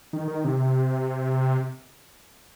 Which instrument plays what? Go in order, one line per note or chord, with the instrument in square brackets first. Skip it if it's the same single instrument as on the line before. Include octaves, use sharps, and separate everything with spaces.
[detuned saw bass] D#3
D#3
C3